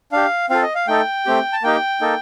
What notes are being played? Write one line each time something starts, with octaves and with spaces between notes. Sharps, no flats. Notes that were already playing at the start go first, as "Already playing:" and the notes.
D4 G4 F5
C4 F4 A4 F5
D#5
F5
A3 D#4 A4 G5
A3 C4 G4
A5
A#3 D#4 G4 G5
A#3 D#4 A4